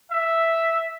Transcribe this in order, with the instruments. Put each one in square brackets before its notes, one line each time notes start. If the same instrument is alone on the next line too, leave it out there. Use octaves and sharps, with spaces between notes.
[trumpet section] E5